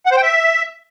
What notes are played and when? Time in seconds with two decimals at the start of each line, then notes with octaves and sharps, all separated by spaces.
0.06 F#5
0.11 C5
0.17 G5
0.22 E5